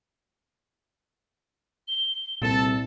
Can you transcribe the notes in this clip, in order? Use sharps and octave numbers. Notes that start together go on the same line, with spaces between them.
G7
C2 A#2 A4 A5